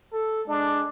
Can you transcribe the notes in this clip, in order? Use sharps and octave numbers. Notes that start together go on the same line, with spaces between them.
A4
G#3 D4